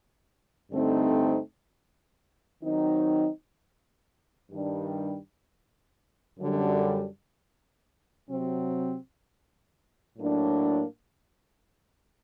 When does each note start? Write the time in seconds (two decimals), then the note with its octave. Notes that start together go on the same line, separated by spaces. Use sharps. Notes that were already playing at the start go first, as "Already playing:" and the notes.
0.72 G2 D3 A3 C4 D#4
2.62 D#3 F#3 C4 D#4
4.51 G2 D#3 G3 D4
6.40 F#2 D3 G3
8.29 C3 F#3 C4
10.18 A2 F#3 A#3 D4